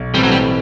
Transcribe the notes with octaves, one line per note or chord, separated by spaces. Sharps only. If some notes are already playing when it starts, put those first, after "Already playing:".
Already playing: B1
A2 E3 G3 A3 C4
F#3
G3